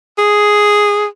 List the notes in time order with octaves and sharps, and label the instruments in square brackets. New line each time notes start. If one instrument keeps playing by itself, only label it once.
[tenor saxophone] G#4